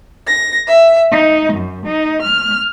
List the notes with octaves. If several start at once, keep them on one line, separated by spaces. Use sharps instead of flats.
A#6
E5
D#4
F#2
D#4
F6